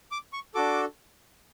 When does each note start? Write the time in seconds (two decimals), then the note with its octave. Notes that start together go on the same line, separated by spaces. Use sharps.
0.11 D6
0.33 C#6
0.55 D4 F#4 A4 D6